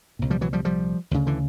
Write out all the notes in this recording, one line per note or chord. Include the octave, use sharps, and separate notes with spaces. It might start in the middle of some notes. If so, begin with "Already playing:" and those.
C2 A#2
F3 G3
E3 F#3
F3 G3
F3 G3
D2 C#3
D3 E3